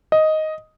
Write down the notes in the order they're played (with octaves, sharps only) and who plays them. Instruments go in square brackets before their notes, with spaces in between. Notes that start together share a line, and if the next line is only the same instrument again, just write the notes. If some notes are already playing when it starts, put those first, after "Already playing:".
[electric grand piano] D#5